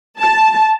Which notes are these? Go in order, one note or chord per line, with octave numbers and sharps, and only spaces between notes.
A5